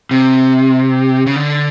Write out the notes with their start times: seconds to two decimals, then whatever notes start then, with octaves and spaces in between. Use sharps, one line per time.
0.11 C3
1.26 C#3
1.36 D3